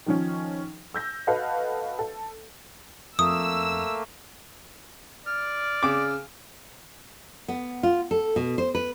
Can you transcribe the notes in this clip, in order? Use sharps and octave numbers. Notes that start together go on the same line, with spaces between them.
D#3 F3 C#4
E6 G6 A#6
F#4 A4 B4 D#5 F5 F#5
A4
F2 A3 A#3 D#6 E6
D5 F6
C#3 D6
B3
F4
A4
B2
C5
B4